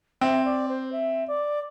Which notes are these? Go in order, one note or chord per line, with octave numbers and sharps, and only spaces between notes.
C4 E5
D5
C5
E5
D5